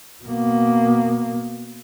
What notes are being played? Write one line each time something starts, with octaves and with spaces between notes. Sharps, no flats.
B2 A#3